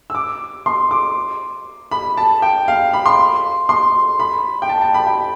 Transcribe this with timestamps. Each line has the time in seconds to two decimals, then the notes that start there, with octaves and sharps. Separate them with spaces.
0.10 E6
0.15 D6
0.66 C6
0.91 D6
1.91 B5
2.17 A5
2.42 G5
2.68 F5
2.93 B5
3.06 C6
3.69 C6
4.20 B5
4.62 G5
4.69 A5
4.81 A5
4.94 B5
5.07 G5